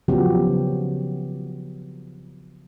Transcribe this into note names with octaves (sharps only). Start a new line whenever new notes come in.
C#3 F3 F#3 B3 F#4 G4